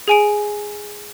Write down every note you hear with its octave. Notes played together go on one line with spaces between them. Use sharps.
G#4 G#5 D7